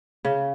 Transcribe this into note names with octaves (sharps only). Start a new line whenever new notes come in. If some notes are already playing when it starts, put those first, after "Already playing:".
C#3